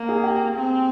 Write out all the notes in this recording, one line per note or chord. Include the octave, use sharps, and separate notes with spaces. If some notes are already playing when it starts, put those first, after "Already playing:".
Already playing: A#3
G#4
G4
C4